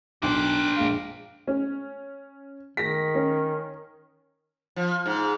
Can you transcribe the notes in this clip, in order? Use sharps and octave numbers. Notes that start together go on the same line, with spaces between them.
B1 D4 A#4 C5 G5 D6 F#6
A#1 G#3 F5
C#4
D#3 A#6 B6
C#4
F3
G#2